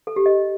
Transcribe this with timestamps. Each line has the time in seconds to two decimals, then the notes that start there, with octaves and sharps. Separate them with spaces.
0.07 A4
0.16 G4
0.26 D#5